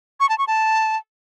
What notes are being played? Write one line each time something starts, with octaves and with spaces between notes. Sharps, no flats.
C#6
A5
C#6
A5